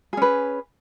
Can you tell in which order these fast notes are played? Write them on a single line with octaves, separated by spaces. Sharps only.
G#4 C#4 B4